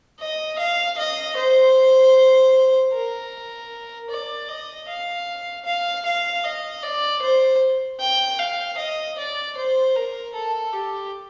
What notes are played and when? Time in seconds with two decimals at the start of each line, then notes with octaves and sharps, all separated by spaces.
0.20 D#5
0.59 F5
0.98 D#5
1.37 C5
2.93 A#4
4.10 D5
4.49 D#5
4.89 F5
5.66 F5
6.06 F5
6.44 D#5
6.83 D5
7.22 C5
8.01 G5
8.39 F5
8.78 D#5
9.18 D5
9.57 C5
9.96 A#4
10.35 A4
10.73 G4